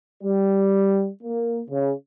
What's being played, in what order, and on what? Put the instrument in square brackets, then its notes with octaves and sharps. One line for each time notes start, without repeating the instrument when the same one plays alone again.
[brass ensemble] G3
A#3
C#3